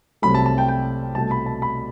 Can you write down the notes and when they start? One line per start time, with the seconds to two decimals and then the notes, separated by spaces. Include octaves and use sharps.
0.22 C2 C3 F#3 A3 B5
0.35 A5
0.46 A5
0.58 G5
0.68 G5
1.15 C2 B2 A3 A5
1.31 B5
1.46 A5
1.62 B5